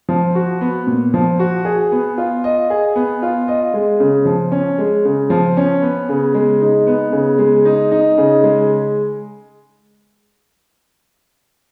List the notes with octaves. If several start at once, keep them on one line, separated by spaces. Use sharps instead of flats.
F3
F#4
B3
A#2
F3
F#4
G#4
B3
F4
D#5
G#4
B3
F4
D#5
G#3
C#3
F3
C#4
G#3
C#3
F3
C#4
B3
C#3
G#3
D#4
B3
C#3
G#3
D#4
D#4
C#3
G#3